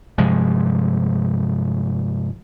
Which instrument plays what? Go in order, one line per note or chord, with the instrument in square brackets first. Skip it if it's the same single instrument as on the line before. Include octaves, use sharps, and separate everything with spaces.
[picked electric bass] G2 C3 F3 G#3